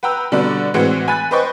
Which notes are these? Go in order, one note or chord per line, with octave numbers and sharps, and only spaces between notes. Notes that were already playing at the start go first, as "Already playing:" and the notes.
B4 F#5 G5 A#5 E6
B2 D3 G3 A3 D4 D5
A2 E3 G#3 C4 F#4 C#7
G#5 B5 F#6 A6
B4 C5 D#5 G5 C#6